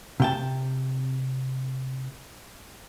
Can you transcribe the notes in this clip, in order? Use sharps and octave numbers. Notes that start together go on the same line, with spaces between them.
C3 G5 A5